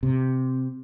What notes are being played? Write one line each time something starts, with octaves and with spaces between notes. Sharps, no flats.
C3